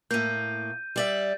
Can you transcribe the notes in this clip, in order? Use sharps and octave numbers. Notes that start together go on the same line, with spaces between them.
A2 A#3 G6 D#7
G3 D5 E5